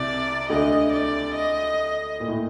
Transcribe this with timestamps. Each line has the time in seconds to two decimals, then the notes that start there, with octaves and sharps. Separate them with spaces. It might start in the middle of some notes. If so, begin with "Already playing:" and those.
Already playing: C2 C3 D5
0.50 D2 D3 D#5
0.92 D5
1.35 D#5
2.20 A#2
2.28 A2